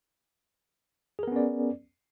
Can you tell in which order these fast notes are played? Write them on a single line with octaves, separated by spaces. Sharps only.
G#4 A#4 B3 C#4 D5